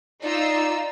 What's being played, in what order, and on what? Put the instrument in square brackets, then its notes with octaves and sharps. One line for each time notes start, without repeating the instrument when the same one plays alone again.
[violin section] D#4 F4 E6 [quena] D5